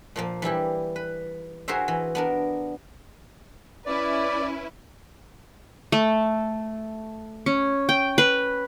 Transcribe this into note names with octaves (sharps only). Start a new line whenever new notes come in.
A#2 F3 A#3
E3 G3 E4 G4
B4
F#4 G#4 A#4 C5 E5
E3
B3 D4 A#4
C#4 E4 B4 D5
A3
C#4
G5
B4